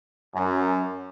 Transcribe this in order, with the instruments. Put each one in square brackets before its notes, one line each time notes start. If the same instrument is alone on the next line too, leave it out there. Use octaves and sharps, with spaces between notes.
[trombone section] F#2